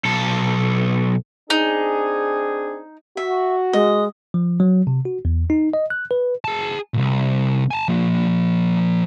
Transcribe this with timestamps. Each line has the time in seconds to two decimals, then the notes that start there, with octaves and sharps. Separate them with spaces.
0.05 B1 A4
1.50 C4 D4 D#4 G#4
3.17 F#4 E5
3.73 G#3 D#5
4.34 F3
4.60 F#3
4.87 C3
5.05 F#4
5.25 E2
5.50 D#4
5.74 D#5
5.90 F#6
6.11 B4
6.44 G#4 A5
6.94 C2 A#2
7.71 G#5 A5
7.88 F3 A#3